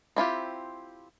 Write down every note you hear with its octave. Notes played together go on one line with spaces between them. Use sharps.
C4 E4 F4 G4